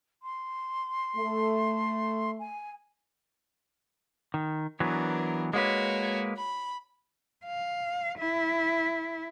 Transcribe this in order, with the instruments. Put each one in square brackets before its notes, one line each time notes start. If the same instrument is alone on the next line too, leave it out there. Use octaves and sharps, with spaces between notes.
[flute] C6
[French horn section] A3
[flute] G#5
[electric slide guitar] D#3
[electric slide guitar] E3 F#3 B3 [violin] D4 A#4
[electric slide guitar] G#3 A#3 B4 [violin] F#4 C#5
[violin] B5
[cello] F5
E4